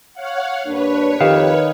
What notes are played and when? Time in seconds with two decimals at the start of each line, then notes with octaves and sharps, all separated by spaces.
0.14 C#5 F5 F#5
0.67 G2 A#3 D4 B4 C#5
1.21 F2 D#3 G4 F5